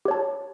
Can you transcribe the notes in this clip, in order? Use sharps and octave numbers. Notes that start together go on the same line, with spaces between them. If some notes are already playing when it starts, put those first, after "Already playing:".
G4 C#5 A5